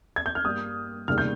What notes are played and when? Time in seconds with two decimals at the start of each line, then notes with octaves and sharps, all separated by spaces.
0.16 G#6
0.26 G6
0.35 F6
0.44 G2 G3 A#3 D#6
1.08 F1 D#2 C#3 G3 F6
1.18 G6